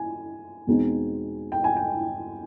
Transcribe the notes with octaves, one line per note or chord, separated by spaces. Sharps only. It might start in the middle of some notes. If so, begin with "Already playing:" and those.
Already playing: G#5
E2 B2 G#3 C4 D#4
G5
G#5
G5